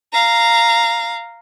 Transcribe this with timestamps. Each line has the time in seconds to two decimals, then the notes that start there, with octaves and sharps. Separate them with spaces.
0.13 F5 A#5